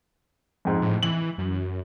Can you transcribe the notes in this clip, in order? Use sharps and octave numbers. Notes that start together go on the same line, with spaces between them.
F2 G#2
A2
E3 F#7
F#2